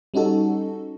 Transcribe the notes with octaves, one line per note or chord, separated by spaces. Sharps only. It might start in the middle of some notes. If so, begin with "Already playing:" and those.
G3 C#4 D#4 F#4 A4